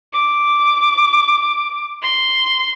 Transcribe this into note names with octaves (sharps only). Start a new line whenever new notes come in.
D6
C6